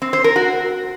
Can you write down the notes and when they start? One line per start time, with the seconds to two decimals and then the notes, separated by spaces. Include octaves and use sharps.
0.02 C4
0.13 C5
0.24 A#4
0.36 F#4